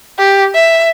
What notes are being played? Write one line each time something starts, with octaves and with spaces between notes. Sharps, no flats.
G4
E5